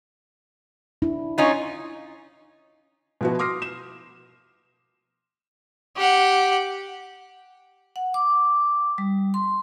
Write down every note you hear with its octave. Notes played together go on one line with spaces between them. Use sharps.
D4 E4
C#4 D#4 F4
B2 F3 B3 E4 F#4
C6 D6 D#6 F6 A#6 C7
E7
G4 F#5
F#5
D6
G3
C6